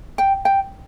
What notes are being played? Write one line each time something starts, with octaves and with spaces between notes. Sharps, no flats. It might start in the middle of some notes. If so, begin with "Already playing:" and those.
G5
G5